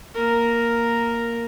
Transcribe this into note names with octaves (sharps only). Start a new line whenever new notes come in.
A#3 A#4